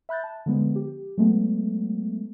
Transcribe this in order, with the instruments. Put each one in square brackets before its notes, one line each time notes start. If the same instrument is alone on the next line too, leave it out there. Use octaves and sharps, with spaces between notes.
[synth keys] E5 B5 F#6 G6 A6
A5
D3 F3 G#3 B3
G4
F#3 G#3 A3 B3